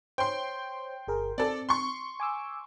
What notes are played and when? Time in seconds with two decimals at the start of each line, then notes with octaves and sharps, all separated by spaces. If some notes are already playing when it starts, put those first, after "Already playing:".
0.18 C5 C#5 G5 C6
1.08 G1 G#4 A#4
1.38 C4 A4 D5
1.69 C6 C#6
2.20 G#5 D6 E6